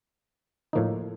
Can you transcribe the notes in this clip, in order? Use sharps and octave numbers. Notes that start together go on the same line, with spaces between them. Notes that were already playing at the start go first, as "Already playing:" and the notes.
A2 F3 A#3 D#4